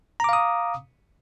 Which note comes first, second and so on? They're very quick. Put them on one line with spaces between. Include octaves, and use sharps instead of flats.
A#5 D6 F5 D#6